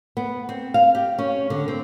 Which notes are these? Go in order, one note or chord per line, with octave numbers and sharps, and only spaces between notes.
B3
C4
F5
G4
C#4
D3
C4